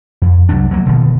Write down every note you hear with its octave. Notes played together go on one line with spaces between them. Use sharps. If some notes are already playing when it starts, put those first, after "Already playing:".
F2
C2 F#3 G3 D4
D2 F#3 A3 A#3
E1 B2 D3 D#3